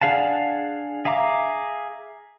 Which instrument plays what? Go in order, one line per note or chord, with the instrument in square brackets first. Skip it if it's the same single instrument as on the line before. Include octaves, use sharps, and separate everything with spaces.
[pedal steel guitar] D4 G#4 F5 F#5 A5
G#4 E5 F5 A#5 D6